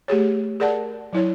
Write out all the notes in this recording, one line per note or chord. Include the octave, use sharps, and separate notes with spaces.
A3 G4 G#4 C#5
G#4 A#4 D5 F#5 A5
F#3 E4 C#5